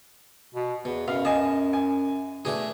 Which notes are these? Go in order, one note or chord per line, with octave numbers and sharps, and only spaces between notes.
B2
E2 B2
F#2 B2 F5
D#5 G#5 A5
G#5
B2 A3 D4 G#4